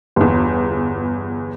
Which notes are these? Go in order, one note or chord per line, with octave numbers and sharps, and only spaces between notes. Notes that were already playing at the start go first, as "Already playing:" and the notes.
G1 E2